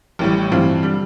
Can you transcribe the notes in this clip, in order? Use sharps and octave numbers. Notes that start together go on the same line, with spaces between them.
A1 A2 G3
G2 E3 G3 C4 F4
D3 G3